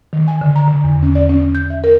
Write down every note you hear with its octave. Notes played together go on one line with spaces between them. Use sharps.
D#3
G#5
D3
A#5
D3
E2
C#4
D5
C#4
G6
E5
A#4